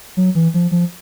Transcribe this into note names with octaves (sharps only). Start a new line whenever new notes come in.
F#3
E3
F3
F3